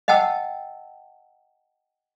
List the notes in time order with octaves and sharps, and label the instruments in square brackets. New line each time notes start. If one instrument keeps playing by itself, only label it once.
[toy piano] D#5 F#5 G5 A5 E6